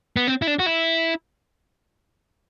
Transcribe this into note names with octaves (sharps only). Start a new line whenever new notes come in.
B3
C4
E4
D4
F#4
E4